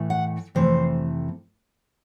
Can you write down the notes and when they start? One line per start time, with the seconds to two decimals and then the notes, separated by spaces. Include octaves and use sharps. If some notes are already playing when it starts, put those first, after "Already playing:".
Already playing: A2 E3 A3
0.10 F#5
0.55 F2 C3 E3 A3 C5